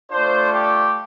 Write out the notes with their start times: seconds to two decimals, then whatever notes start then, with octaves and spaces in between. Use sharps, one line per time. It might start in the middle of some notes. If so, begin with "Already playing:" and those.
0.11 A3 D4 F4 C5
0.53 G4